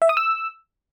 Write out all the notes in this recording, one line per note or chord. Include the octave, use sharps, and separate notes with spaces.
E5
D#6
E6